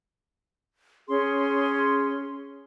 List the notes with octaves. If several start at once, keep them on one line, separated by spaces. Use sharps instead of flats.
C#4 G#4 C6